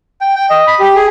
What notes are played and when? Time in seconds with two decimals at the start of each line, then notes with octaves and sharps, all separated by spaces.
0.21 G5
0.36 G5
0.50 D#5
0.67 B5
0.80 G4
0.96 G#4